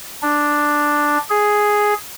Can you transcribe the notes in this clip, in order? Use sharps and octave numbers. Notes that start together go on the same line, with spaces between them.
D4
G#4